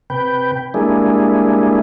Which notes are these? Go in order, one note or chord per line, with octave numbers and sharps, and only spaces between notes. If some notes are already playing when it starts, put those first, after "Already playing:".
C3 B4 G5
G3 G#3 A#3 D4 E4 G#4